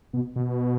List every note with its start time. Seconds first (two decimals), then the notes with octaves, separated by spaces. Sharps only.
0.13 B2
0.36 B2